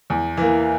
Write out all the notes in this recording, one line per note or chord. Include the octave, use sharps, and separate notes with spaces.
E2
E3 A#3